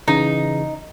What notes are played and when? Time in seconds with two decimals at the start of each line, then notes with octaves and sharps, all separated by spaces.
0.08 C#3 E3 D#4